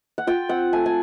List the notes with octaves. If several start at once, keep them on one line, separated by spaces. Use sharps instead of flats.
F#5
F4 G5
C4 F#5
A3 G#5
G#5